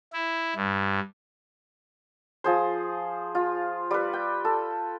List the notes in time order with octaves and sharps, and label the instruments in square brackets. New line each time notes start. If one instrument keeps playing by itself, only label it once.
[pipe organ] E4
G2
[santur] F3 G#4 C5
F4
G3 B4
G5
A4